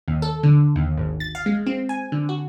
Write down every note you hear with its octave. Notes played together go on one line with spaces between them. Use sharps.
D#2
A4
D3
D#2
G#1
A6
F5
G#3
C4
G#5
D3
F#4